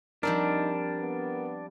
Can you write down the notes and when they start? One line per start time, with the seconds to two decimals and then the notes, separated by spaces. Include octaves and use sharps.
0.23 F3 G3 C4 D4 D#4 A#4
0.98 B3